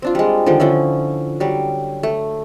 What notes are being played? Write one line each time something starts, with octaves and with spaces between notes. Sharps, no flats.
C4 D4 F4
G3 G#3
D3 D#3 F3 G3
D3 F3 C#4 E4
F#3 G3
A3